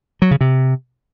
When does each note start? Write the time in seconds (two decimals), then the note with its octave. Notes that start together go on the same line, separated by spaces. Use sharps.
0.22 F#3
0.31 C#3
0.41 C3